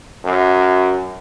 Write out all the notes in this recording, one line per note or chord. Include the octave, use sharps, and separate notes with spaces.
F#2